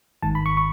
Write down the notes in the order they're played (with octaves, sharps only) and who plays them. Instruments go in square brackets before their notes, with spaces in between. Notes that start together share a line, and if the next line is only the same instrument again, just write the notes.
[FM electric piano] G#1 G#2 D#3 A5
B5
C#6
C#6